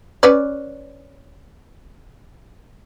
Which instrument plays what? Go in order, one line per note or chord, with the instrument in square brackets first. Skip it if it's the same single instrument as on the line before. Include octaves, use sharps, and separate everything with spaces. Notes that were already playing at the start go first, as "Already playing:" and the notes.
[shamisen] C#4 B4 D5